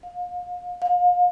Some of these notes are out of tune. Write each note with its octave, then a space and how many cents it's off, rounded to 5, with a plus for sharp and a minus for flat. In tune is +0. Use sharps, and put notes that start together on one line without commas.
F5 +35
F5 +35